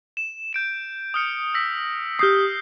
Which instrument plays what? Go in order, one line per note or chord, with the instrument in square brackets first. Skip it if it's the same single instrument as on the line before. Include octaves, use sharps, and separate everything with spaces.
[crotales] E7
G6 D7 E7
D#6 F6 C#7
E6 A#6 B6
[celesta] G4 D#6 [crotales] F6 G6 C7